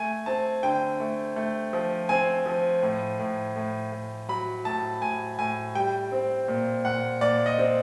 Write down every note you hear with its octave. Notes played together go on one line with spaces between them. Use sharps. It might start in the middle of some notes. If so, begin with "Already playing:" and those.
Already playing: A3 G#5
C4 A5
D3 G5
A3
A3
F3
C4 G#5
F3
A2
A2
A2
A2
F#3 B5
A2 A5
A2 G#5
A2 G#5
G3 G5
C4
A#2
A#2 F#5
A#2 D5
D#5
C4